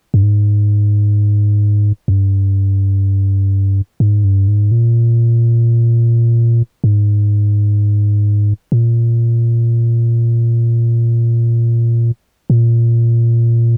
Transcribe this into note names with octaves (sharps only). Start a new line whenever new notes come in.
G2
G#2
F2
G2
G#2
G2
G#2
A#2
G#2
A#2
A#2